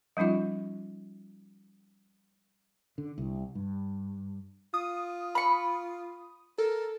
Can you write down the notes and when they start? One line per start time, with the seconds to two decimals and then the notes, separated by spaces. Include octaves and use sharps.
0.17 F3 G3 C#4 D#4 F4
2.98 D3
3.18 C2
3.55 G2
4.74 F4 D#6
5.35 B5 C#6
6.58 A4 A#4